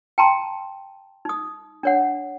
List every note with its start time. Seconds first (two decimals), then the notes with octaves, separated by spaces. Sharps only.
0.18 G5 A5 A#5 C6
1.25 D#4 D#6
1.83 D4 C#5 F#5